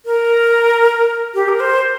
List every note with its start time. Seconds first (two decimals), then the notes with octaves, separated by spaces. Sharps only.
0.06 A#4
1.34 G4
1.48 A#4
1.60 C5